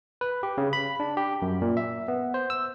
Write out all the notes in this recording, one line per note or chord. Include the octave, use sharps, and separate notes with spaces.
B4
G4
C#3
B5
D4
G4
F#2
A#2
E5
B3
C5
E6